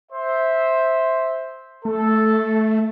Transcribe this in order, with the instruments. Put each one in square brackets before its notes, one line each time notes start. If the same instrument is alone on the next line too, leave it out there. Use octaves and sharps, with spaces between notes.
[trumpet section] C5 E5
[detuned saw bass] A3 [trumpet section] A4